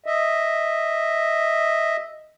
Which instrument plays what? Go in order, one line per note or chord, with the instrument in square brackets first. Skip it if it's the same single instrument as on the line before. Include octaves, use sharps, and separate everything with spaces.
[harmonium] D#5 E5